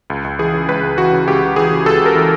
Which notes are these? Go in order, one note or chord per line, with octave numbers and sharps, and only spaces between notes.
C#2
C#2
E3 G#4
C#3
C#2 B4
C#2
E3 F#4
C#3
C#2 G4
C#2
E3 G#4
C#3
C#2 A4
C#2 A#4
E3